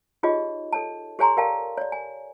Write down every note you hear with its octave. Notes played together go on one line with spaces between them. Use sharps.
D#4 F4 G4 G#4 C#5 D#5
A4 C#5 A5
G4 A4 C#5 G#5 A#5 C6
G4 A#4 D5 F5 G5 A5
C#5 D5
G#5